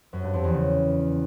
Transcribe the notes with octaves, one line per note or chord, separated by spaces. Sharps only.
F#2
G2
F2
E2
C#3